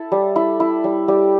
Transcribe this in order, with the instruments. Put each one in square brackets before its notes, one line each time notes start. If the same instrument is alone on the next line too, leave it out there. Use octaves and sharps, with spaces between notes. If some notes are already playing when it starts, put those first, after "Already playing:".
Already playing: [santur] E4 A4
G3
E4
E4
G3
G3 G4